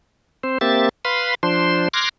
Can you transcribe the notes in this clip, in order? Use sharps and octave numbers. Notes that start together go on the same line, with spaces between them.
C4 C5
A#3 C4 G4 E5 A6
B4 F5 B5 C6
F3 D4 C5 C6
C6 D6 F6 F#6 G#6 A#6